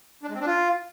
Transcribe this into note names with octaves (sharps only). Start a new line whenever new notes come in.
D4
G#3
C4
D4
F4